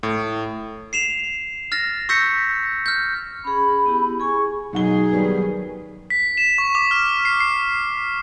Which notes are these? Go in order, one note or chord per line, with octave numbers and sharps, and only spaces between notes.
A2
C7 E7 F7
F6 A6 A#6
C#6 E6 G6 A#6 B6 C#7
F6 G6
C#4 G#4 B5
B3 E4 G4
G#4 G#5 C#6
B2 F#3 D#4 G#4 F#5 G7
D#3 G3 B3
B6
E7
C#6
D6
F6
C7
C7